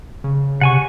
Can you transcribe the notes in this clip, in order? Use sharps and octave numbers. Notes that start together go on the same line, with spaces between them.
C#3
C3 F#5 G#5 C#6